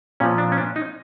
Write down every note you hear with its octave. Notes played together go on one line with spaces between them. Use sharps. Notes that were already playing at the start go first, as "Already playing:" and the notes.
A#2 F3 C#4
D4
C#4
D4
D#4